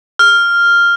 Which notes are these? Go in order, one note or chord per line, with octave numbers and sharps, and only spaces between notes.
F6